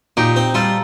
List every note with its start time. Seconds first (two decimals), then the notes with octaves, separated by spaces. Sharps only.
0.17 A#2 D#4 G4
0.36 C4
0.54 G3 F4 A4